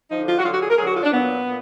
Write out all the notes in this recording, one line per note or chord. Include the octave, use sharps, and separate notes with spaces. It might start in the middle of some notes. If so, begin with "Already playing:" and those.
D3 F3 D#4
F4
F#4
D3 F#3 F4
F#4
G#4
A#4
D3 F#3 G#4
F#4
F4
D4
A#2 F#3 B3
A#2